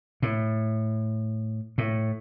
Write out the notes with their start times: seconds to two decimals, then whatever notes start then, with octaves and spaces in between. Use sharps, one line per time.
0.22 A2
1.78 A2